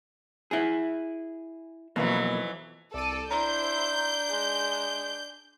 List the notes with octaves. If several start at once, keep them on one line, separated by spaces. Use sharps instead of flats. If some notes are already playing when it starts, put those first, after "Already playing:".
E4 G#4
B1 F2 B2 E3 F#3 A#3
C2 A4 D5 D#7
D4 E4 C5 A#5 G6
G#3